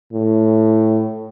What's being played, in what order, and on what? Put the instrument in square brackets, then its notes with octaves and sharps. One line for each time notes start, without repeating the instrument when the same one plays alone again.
[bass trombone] A2